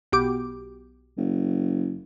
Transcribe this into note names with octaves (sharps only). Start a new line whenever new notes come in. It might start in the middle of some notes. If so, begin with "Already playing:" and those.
B1 G4 D6
F#1